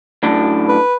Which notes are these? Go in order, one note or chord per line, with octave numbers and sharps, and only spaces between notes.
F#2 A2 D4
B4